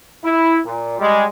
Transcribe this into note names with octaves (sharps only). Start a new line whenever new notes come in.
E4
A#2
G3 G#3